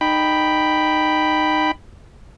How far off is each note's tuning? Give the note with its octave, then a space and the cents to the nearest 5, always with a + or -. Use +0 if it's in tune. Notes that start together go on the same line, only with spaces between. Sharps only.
D#4 -20 G5 +0 B5 +0